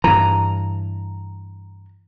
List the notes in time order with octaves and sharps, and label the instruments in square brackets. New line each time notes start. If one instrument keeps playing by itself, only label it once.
[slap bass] G2 E3 [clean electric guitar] A#5